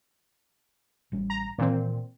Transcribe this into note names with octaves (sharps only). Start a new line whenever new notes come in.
A1 G3 C#4
A#5
A#2 D#3 E3 C4